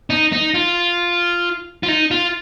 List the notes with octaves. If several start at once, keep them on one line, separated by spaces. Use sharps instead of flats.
D#4
D#4
F4
F4
D#4
F4